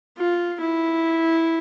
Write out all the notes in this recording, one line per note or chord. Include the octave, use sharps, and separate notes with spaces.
F4
E4